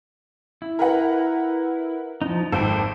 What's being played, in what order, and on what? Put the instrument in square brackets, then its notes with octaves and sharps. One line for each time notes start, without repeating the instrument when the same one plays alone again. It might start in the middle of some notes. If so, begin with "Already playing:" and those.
[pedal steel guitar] E4
[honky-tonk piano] A#4 B4 F#5
[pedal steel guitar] F3 D#4
[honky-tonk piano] G#1 [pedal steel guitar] A4 C5 G5